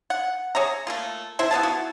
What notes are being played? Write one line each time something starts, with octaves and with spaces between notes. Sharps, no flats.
F#5
G#4 C#5 E5 A#5
A3 A#3 F4
C3 E4 C5 E5
B3 A4 F5 A5
E4 F#4